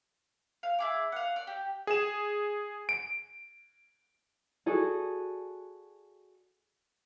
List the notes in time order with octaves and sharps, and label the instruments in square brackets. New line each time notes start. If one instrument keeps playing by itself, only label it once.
[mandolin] F5
E4 G#4 D6
F5 F#5
D5
G4
[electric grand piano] G#4 E7
D7
[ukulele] F#4 G#4 A4 D5